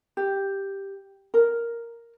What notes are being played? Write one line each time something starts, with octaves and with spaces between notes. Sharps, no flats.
G4
A#4